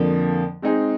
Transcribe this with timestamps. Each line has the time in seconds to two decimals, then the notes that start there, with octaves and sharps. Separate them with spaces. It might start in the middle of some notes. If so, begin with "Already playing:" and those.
Already playing: F2 D3 F3 A#3
0.62 G#3 C4 D#4 G#4